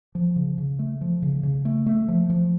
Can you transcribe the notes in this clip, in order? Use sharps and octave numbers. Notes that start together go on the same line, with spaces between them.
F3
C#3
C#3
A3
F3
C#3
C#3
A3
A3
F3
F3